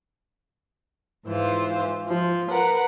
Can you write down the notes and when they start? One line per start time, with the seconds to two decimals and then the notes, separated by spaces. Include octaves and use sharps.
1.26 G#2 E3 F4 C5
2.07 F3
2.50 A#4 B4 F#5